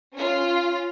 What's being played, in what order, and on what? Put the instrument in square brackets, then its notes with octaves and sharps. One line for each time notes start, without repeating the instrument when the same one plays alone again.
[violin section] C#4 F4